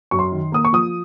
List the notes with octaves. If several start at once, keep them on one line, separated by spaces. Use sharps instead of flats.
F#2 C#6
C6
D#3
A#3 D#6
C#6
F3 D#6